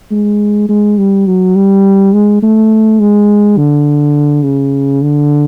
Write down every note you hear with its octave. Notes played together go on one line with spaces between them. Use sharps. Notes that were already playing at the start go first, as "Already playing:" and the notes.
G#3
G#3
G3
F#3
G3
G#3
A3
G#3
D3
C#3
D3